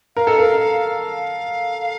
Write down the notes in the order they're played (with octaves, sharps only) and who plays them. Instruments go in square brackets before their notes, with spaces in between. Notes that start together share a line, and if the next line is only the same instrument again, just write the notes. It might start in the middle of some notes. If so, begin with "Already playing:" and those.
[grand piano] A#4 [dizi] F5
[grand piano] A4 [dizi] D#5
[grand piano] A#4 [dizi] F5
[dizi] F5
F5
F5